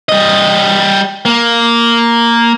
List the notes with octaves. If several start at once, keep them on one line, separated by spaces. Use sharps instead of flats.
G3 D#5
A#3